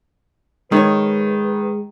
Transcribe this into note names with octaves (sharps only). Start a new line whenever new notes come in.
D#3 G#3 B4 C#5